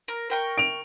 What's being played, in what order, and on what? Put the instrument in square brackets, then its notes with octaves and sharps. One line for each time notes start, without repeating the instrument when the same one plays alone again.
[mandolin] A#4
A#4 G5 C#6
[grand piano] D7 F7